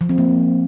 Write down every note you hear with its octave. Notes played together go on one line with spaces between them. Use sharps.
F3
C4
A#3